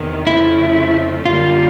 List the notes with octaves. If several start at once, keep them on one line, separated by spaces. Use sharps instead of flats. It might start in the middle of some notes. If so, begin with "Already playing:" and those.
Already playing: E2 C3 D#3
F2 C#3 F3 A3 E4
F#2 D3 G3 A#3 F4